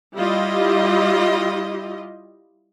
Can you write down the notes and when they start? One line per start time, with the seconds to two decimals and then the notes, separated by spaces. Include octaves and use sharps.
0.15 G3 E4 F4 G4 D#5